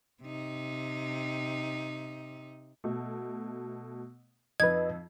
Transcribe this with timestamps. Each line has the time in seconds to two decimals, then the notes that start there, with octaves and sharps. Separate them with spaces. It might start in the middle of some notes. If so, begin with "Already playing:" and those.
0.22 C3 D#4
2.84 B2 A3
4.60 F2 D#4 B4 D#5 G#6